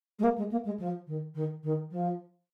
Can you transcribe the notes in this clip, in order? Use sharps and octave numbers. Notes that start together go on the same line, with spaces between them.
G#3
A#3
G#3
A#3
G#3
F3
D#3
D#3
D#3
F3